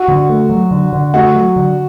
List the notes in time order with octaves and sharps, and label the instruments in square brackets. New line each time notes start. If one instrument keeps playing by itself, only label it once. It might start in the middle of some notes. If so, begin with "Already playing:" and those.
Already playing: [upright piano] F#4
[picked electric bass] D3
A3
F#3
D3
D3
[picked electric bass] A3 [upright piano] F#4
[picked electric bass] F#3
D3